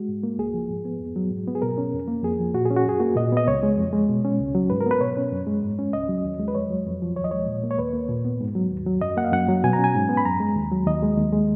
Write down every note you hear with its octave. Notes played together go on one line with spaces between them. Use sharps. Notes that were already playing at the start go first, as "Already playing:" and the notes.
Already playing: G#3 F#4
G#2
A#3
C#2 G#4
F3
G#2
B3
F2
F#3
G#2
B3
G#4
B2 A#4
C#4
F2
A#3
F2 G#4
F3
A#2 F#4
C#4 G#4
F#4
F#2 G#4
A#3 F#4
A#2 D#5
B3 D#5
C#2 C#5
G#3
F2
G#3
B2
C#4
C#2
F#3
G#2 B4
A#4
B3 B4
B2 C#5
C#4
F#2
G#3
G#2
C#4
C#2 D#5
F#3
D#2
G#3
B4
F2 C#5
F#3
F2
F3
D#2 C#5
D#5
G#3 C#5
A#2
A#3
C#5
D#2 B4
A#3
A#2
B3
G#2
F#3
D#2
F#3
F#2 D#5
A#3 F#5
F5
F#2 F#5
F#3
B2 G#5
A#5
C#4
G#5
G#2
B3
B5
F#2 A#5
G#3
D#2
F#3
D#2 D#5
G#3
D#2
G#3